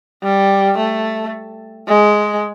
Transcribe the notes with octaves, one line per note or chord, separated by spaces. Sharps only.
G3
A3
G#3